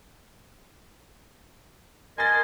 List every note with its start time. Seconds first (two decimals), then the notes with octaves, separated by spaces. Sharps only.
2.18 A#4 D#5 G#5 C6 G#6 A6